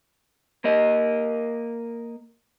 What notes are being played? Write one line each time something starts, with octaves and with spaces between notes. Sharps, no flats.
A#3 A#4 D#5